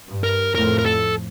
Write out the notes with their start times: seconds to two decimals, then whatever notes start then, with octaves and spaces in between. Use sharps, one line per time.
0.09 G2
0.24 A#4
0.54 F2 A2 A#4
0.79 A#4
0.86 A4